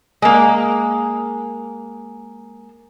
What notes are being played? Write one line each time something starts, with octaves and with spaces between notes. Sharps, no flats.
G#3 A#3